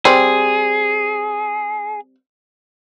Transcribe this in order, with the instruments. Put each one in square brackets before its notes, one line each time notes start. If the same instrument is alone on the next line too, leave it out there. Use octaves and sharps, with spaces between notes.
[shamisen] G3 C4 [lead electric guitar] G#4